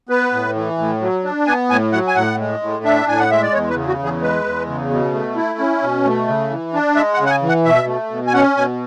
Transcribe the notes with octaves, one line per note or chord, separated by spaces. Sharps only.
B3 B4
A2
E3
A2
F#3
D4
B3 G#5
A2 G#5
F#3 F#5
G#5
A2 F#5
G#3
A2
D4 E5
A2 G#5
F#5
G#3 E5
D5
E2 C#5
B4
C#3
F#4
E2
G#4
G#3 B4
E2
C#3
B2
A3
E4
C#4
B2
A3
C#3
E3
D4
G#3 E5
F#5
C#3
F#5
G#5
E3
F#5
B2 E5
A3
B2
G#5
C#4 F#5
B2 G#5